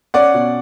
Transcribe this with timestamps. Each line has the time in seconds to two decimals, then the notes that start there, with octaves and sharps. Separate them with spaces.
0.14 C#4 D5 F#5
0.34 B2